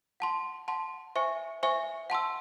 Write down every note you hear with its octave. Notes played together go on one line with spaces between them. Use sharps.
F#5 A5 C6
F#5 A5 C6
C5 E5 G#5 C#6
C5 E5 G#5 C#6
F#5 A5 C6 E6